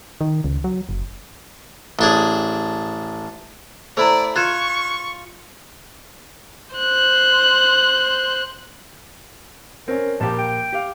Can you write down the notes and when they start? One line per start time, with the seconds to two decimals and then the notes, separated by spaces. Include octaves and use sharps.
0.21 D#3
0.44 C#2
0.64 F#3
0.89 F#1
1.99 A1 D4 G#4
3.97 A3 E4 C5 D5 A#5
4.36 F4 C#6 F#6 G#6 E7
6.76 C5 F#6
9.88 C4 C#4 A#4
10.20 A#1 A#3 G4 A5
10.38 G5
10.73 G4 F5